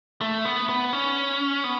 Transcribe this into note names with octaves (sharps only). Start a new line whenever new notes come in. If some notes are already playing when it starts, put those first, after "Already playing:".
A3
B3
B3
C#4
B3